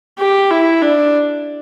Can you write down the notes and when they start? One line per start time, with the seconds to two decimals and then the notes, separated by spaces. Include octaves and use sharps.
0.19 G4
0.51 E4
0.82 D4